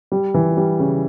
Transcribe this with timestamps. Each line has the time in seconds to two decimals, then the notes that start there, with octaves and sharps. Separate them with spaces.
0.12 G3
0.34 E3
0.57 G3
0.79 C#3